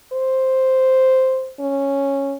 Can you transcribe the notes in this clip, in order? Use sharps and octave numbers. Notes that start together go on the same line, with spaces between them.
C5
C#4